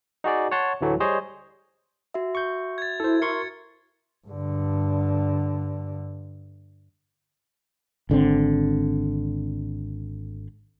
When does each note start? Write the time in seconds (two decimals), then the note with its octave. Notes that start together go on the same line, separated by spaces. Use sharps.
0.24 D#4 F#4 G#4 D5
0.51 C#5 F#5 A5 C6
0.81 D2 A2 E3 F#3 A3
1.00 G3 G#4 C5 C#5 D#5
2.14 F#4 E5
2.35 C#6 G6
2.78 G#6 A6
3.00 E4 A4 C5
3.22 A#4 C6 C#6 C#7
4.27 G2 D3
8.10 G#1 D3 D#3 C4